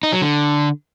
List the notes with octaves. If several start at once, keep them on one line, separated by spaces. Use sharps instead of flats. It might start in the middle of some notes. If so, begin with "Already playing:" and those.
D#4
F#3
D3